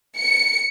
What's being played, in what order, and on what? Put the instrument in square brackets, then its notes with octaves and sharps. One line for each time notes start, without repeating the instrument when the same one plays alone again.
[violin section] C#7